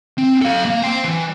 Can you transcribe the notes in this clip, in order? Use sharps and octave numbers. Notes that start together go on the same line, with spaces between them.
C4
A4 F5
A#3
C5 G5
E3